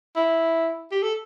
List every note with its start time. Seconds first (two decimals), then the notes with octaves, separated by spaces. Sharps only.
0.16 E4
0.92 G4
1.03 A4